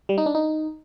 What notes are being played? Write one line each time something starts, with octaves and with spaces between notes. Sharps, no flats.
G3
D#4
D4
D#4